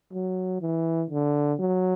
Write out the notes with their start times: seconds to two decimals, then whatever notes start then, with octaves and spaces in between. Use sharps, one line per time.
0.13 F#3
0.61 E3
1.10 D3
1.59 F#3